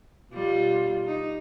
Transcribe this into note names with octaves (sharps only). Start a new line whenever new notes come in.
B2 G3 F4
D#4